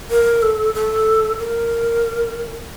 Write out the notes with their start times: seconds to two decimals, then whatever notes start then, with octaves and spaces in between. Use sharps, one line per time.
0.10 A#4
0.42 A4
0.74 A4
1.39 A#4